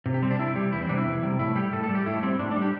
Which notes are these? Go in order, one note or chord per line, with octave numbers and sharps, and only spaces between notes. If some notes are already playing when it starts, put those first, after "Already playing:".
C3
G4
G3 C4
D4
C3 E4
G3 G4
E2 E4
C4
C3 G3 D4
E4
E2
C3 G3
A2 E4
G3 G4
A2 A4
A4
G3
G4
A2 E4
G3 C4
A2 D4
D4
G3
G4